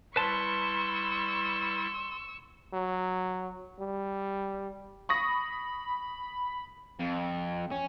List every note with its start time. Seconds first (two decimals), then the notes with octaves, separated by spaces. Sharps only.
0.16 G3 E4 B4 A5 C6 C#6 E6
2.73 F#3
3.79 G3
5.09 B5 C#6 D#6 A#6
6.99 F2
7.71 C#4